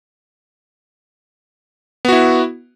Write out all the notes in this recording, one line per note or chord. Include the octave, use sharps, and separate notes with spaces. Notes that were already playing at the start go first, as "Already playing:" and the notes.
B3 E4 F#4